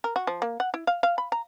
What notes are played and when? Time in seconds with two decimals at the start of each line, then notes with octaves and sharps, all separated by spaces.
0.04 A#4
0.16 F#4
0.27 F3
0.42 A#3
0.60 F#5
0.74 E4
0.87 F5
1.03 F5
1.18 B5
1.32 A#5